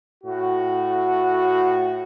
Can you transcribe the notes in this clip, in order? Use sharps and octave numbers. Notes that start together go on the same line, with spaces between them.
A2 F#4